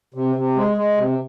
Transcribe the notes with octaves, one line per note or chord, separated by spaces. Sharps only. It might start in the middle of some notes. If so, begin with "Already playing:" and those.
C3
C3
G#3
G#3
C3